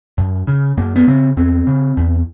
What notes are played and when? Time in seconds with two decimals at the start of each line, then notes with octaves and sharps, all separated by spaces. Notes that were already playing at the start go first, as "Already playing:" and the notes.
0.18 F#2
0.47 C#3
0.77 F#2 A#3
0.96 B3
1.07 C#3 C4
1.37 E2 C4
1.67 C#3
1.97 E2